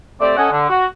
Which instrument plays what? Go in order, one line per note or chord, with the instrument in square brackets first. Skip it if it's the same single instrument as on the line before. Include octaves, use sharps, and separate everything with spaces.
[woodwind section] A3 C4 G4 D5
C#4 A4 D#5 F#5 G#5
D3
F#4